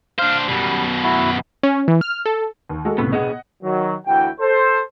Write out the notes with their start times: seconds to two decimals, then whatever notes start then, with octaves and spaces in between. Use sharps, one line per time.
0.19 D4 C5 F5
0.48 F#2 B2 G3
1.03 E4 F#4
1.63 C#4
1.88 E3
2.01 F6
2.26 A4
2.69 D#2
2.85 G#3 F#4 A4
2.98 C#2 A2 C3 B3
3.12 B2 B3 G#4 D#5 F#5
3.63 D#3 F#3
4.06 D2 E3 E4 F#4 G5
4.40 A4 C5